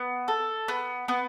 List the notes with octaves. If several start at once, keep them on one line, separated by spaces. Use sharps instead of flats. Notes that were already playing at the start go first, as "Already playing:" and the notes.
Already playing: B3
A4
B3
B3